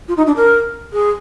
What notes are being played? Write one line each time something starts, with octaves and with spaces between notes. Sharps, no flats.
F4
D#4
D4
A#4
G#4